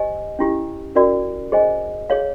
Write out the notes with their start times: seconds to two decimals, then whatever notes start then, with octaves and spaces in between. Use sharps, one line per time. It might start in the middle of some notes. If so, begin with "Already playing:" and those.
Already playing: G4 C5 D#5 G#5
0.39 C#4 E4 G4
0.96 C#4 F#4 A#4 D5
1.52 G#4 C5 D#5 G#5
2.10 G#4 C#5 F5